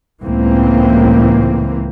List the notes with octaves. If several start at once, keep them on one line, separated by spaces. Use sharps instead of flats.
C#2 A2 E3 A#3 C4